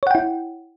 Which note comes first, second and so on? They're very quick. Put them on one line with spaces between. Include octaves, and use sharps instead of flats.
C#5 F#5 G5 E4